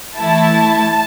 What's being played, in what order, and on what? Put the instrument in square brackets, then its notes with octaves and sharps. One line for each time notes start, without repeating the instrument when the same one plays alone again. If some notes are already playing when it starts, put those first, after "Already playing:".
[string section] E3 A3 E4 A5